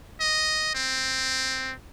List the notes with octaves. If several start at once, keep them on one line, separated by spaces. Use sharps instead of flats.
D#5
C4